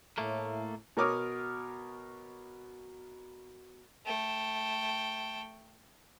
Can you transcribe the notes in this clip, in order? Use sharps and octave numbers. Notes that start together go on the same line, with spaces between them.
A2 A3 A#3
B2 A#4 C#5 D6 D#6 F6
A3 G5